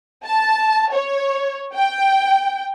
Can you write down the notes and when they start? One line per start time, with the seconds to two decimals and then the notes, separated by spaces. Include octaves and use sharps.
0.25 A5
0.91 C#5
1.74 G5